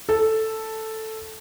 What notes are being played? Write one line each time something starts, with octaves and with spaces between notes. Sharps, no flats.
A4